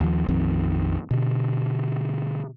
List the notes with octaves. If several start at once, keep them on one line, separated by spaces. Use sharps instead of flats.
D#2 F3
A#1 F2 D#3 C4
B2 D3